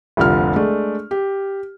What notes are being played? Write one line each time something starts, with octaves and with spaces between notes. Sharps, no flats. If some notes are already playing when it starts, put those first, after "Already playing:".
F1 C2 D3 F3 F6
G#3 A3 D4 D5
G4